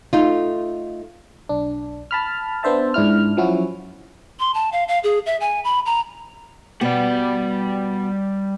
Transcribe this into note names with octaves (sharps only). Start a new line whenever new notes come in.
A3 D#4 F4
B1 D4
A5 B5 F6
B3 D4 C5 E5 A5
G#2 D4 E4 F6
F3 F#3 C#4 E4 F#4
C6
A5
F5
F5
G#4
E5
G#5
B5
A#5
B2 G3 B3 D5